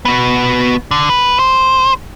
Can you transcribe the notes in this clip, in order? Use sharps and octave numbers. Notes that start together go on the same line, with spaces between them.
B3 F#4
D3
B4
C5